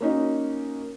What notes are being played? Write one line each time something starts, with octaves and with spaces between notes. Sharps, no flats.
A#3 C#4 D#4 F#4